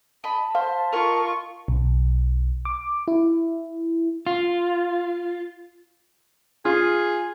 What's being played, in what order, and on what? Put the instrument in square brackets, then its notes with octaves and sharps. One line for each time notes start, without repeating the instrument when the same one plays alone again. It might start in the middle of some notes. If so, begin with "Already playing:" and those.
[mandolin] D#5 B5 [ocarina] A5
[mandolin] C5 [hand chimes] F5
[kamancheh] F4 C#6 [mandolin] A#4 D#5
[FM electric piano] B1
D6
E4
[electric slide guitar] F4
[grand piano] F4 [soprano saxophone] G#4